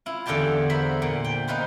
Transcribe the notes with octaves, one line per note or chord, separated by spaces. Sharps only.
E4 F4
E2 D3 F4 G4 G5 A5
A#4 C5 E5 B5
A#2
G5
D#4 F4 B4 C5